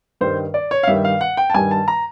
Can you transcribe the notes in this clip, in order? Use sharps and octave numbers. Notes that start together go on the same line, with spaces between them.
G2 D#3 G3 C5
D5
C#5
F5
G2 D#3 G3 E5
F5
F#5
G5
A5
G2 D#3 G3 G#5
A5
A#5